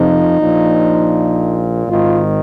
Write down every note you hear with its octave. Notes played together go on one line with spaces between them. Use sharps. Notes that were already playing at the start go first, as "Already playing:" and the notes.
Already playing: F2 C3 F3 D#4
A#1 A#2 F3
G#1 G#2 D#3 F4